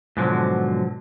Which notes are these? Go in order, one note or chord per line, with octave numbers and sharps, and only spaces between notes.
G#2 B2 D3 F3 F#3